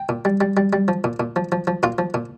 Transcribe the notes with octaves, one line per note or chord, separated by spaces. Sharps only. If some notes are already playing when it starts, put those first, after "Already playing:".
Already playing: G5
A#2
G3
G3
G3
G3
F3
A#2
A#2
F3
F3
F3
A#2 F4 F5
F3
A#2